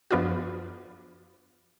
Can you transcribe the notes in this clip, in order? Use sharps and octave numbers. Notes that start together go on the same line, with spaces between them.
F#2 F3 B3 D4 F4 F#4